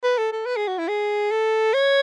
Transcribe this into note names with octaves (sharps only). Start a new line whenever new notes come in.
B4
A4
A4
B4
G#4
F#4
E4
G#4
A4
C#5